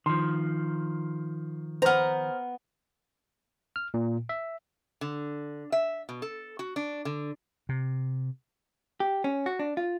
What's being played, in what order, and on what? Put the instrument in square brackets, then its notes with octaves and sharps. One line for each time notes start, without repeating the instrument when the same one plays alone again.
[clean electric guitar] D#3 F3 [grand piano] C6
[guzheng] B3 A#5 [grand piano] C5 F6
[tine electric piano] F6
A#2
E5
[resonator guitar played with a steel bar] D3
E5
B2
A4
F#4
D4
D3
[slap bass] C3
[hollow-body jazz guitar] G4
C#4
F#4
D4
F4